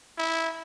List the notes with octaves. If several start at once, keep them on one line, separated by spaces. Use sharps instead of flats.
E4